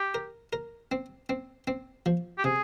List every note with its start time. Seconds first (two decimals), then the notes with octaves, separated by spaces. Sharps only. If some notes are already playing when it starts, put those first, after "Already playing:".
Already playing: G4
0.14 A#4
0.53 A#4
0.92 C4
1.29 C4
1.67 C4
2.06 F3
2.38 G4
2.44 C3 G#4